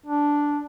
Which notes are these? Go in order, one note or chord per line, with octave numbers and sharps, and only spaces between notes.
D4